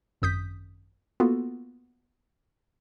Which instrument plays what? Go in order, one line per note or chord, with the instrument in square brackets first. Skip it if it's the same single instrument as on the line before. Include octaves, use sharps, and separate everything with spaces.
[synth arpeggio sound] G#1 F#2 D#6 G6 B6
A#3 B3 F4 F#4 A4